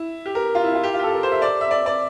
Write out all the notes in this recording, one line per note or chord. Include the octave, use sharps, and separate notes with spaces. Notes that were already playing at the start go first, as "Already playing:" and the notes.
Already playing: E4
G4
A#4
F4
E4
F4
G4
F4
G4
A4
A#4
C5
E5
D5
E5
D5
D5